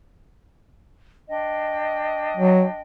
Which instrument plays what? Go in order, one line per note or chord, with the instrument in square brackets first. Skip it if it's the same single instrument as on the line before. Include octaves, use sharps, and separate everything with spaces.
[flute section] D4 D#5 G5
[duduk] F#3